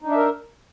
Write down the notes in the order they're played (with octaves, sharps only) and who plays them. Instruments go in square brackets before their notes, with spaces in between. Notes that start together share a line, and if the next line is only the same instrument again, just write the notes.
[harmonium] D#4
D4
E5
A#4